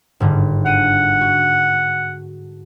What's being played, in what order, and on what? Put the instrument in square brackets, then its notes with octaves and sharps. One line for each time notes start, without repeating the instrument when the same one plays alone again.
[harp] G1 G#2 D3
[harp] F5 D#7 [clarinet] F#5
[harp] F#4